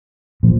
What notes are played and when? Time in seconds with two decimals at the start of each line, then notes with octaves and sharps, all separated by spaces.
0.43 A#2 F3